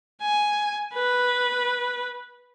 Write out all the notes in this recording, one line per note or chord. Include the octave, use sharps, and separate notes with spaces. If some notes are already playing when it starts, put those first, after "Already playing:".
G#5
B4